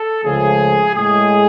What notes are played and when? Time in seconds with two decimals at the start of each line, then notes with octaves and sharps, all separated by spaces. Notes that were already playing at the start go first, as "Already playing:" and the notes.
Already playing: A4
0.24 C#2 C#3 F3 A3 G#4
0.95 A2 G#3 G#4